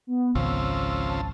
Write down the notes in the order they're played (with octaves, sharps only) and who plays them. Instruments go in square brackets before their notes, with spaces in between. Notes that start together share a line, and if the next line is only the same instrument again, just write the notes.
[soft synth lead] B3
[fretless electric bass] G#1 C#2 [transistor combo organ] C#3 F3 C4 [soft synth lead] E6
[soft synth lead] A5